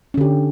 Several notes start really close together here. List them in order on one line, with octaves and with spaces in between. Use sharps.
C#4 D3 G4